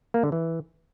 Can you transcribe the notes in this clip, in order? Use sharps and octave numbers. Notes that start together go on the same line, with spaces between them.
A#3
D3
E3